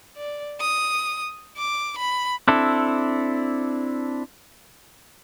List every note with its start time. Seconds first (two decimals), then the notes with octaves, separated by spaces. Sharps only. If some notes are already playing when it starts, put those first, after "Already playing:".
0.16 D5
0.61 D#6
1.58 D6
1.98 B5
2.48 C4 D4 E4 A4